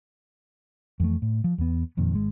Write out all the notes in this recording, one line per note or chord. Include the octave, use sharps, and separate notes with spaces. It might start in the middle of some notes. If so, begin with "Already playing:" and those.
F2 E3 A3
A2
F3
E2 B3
E1 F2 A#2 D#3
G#1 G#3